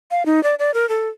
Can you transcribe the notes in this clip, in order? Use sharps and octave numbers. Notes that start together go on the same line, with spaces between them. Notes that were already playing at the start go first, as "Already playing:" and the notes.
F5
D#4
D5
D5
A#4
A4